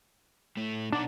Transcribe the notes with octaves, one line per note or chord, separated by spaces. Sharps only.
A2 A3
B2 D4 D#4 F#5